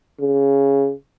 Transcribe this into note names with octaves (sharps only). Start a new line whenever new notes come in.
C#3